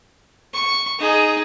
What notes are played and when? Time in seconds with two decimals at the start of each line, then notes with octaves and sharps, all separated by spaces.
0.54 C#6
0.99 D#4 G#4